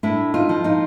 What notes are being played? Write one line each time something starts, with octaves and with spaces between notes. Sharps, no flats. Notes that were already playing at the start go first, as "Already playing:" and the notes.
A2 D4 E4
D#4 F4
F3
D#4 F4